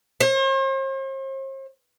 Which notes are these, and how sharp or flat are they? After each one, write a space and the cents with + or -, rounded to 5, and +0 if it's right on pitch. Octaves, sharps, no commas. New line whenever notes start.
C5 +45